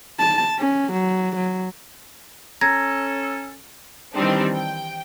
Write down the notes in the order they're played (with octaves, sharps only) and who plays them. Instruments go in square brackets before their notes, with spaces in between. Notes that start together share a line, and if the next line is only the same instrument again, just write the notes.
[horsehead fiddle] A5
C#4
F#3
F#3
[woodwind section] C#4 A4 [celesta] A#5 G#6 A#6
[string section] D#3 E3 G3 C4 D4 D#4
G5